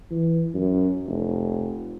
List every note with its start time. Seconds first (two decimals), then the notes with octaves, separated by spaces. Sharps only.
0.11 E3
0.55 F#2
1.07 F1